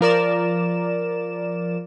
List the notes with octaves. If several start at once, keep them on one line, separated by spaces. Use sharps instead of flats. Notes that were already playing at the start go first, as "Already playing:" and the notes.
F3 A#4 D5 E7